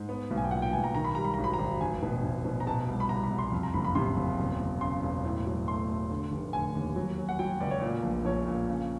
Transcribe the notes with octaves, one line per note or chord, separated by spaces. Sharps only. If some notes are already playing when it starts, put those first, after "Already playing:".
Already playing: G#2
B3
B1
G#5
G5
A#2 F#5
G5
B1 G#5
A#5
D#3 A#5
B5
G3 A#5
B5
G#1 A#5
B5
A#5
G#1
F1 G#5
B2
F1
B2
A#5
B2 A5
C2
B5
C2 A#5
B5
C2
C6
F2
A#5
F#1 B5
B5
C3 C6
F#1
E1
E1
C#3 C6
E1
A2
F#3
A3 C6
A3
D3
F1
D3 G#5
D#2
F#3
F#3
F#5
F#3 G5
C#2 D5
C#5
A#2 D5
A#1
A#1 C#5
A#2
C#3